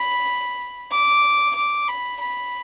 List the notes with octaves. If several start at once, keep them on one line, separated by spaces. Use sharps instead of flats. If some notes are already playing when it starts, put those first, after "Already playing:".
Already playing: B5
D6
D6
B5
B5